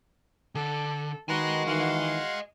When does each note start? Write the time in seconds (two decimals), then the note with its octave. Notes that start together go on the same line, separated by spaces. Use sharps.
0.55 D3 A4
1.29 D#3 F#4 B4 D#5 G#5 A#5 C6
1.67 D#3 E3 F5 F#5 C6